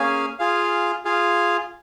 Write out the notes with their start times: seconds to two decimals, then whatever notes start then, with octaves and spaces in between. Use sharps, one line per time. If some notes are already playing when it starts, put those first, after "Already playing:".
Already playing: A#3 C#4 G#4 F5 G#5
0.39 F4 G#4 F5
1.05 F4 G#4 F5